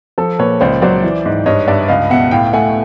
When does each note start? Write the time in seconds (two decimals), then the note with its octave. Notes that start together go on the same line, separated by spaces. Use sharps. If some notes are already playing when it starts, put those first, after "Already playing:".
0.18 F3 A4
0.39 A#2 B4 C#5
0.61 C#2 C5 D5
0.82 F#3 C5 D5
1.03 E3
1.25 G#2
1.46 G2 C#5 D#5
1.68 G2 D5 E5
1.88 C#2 D#5 F5
2.10 B2 E5 F#5
2.31 A2 F5 G5
2.53 A3 F#5 G#5